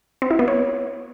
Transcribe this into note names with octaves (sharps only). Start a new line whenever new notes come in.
C4
E4
B3
C#5